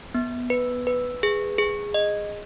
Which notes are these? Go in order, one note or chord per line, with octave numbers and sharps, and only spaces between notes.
B3
B4
B4
G#4
G#4
D#5